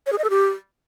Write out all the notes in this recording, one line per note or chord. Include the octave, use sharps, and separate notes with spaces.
C#5
G#4
D#5
A4
G4